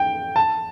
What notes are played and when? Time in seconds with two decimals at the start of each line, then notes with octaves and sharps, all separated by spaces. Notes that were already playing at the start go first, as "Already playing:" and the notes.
Already playing: G5
0.36 A5